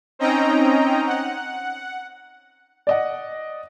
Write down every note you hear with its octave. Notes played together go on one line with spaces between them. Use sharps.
C4 C#4 D#4 D#5 G5 A#5
F#5
D5 D#5 F#5